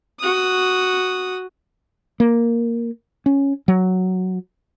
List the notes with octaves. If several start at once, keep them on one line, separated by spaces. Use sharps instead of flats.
F#4 D#6
A#3
C#4
F#3